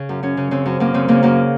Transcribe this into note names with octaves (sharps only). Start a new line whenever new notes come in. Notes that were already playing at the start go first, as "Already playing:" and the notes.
Already playing: C#3
F#2
F#2 C#4
C#3
C#3 C4
F#2
F#2 A#3
C#3 C4
C#3 A#3
F#2 A#3